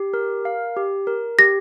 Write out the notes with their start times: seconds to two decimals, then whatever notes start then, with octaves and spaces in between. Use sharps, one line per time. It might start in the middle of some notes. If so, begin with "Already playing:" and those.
Already playing: G4
0.14 A#4
0.45 F5
0.76 G4
1.07 A#4
1.39 G4 A#6